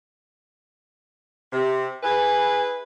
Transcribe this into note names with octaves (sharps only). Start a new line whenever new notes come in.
C3
E4 G#4 B4 G#5